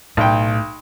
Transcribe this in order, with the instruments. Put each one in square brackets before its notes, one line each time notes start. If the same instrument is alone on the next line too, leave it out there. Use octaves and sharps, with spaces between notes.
[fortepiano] B1 G5 [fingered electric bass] A2